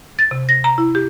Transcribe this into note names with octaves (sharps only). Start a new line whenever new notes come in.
A6
C3
A#6
A#5
E4
G4